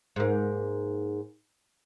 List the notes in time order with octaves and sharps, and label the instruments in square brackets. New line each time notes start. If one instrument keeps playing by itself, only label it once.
[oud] G#2 A#3